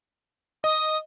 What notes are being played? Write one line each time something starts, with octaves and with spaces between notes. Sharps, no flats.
D#5 D#6